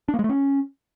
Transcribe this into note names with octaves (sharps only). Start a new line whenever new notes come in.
D4
A#3
G#3
A3
C#4